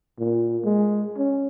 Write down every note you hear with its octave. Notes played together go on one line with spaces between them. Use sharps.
A#2
G#3
C#4